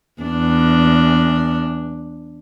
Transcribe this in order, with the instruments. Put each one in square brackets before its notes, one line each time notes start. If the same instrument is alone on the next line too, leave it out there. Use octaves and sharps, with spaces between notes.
[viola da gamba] E2 D4